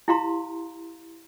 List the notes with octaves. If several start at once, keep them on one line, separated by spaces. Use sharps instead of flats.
E4 G4 F5 A#5 C6